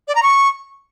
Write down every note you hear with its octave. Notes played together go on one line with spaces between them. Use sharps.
D5
A#5
C#6